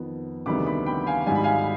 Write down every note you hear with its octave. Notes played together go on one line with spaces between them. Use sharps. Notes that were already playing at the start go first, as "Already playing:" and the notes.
Already playing: F2 D#3 B3
D2 C3 D#3 G3 B3 B5 D6
B5 D6
G5 B5
B5
F5 G#5
G#1 G#2 G3 G#5
B5
F5 G#5